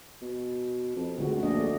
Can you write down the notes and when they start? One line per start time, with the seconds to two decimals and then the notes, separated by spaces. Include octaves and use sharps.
0.21 B2
0.96 F2
1.18 C#2 D3 A3 F#4
1.43 A#1 A3 D4 D#5